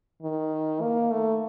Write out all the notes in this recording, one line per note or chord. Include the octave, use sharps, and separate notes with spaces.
D#3
A#3
A3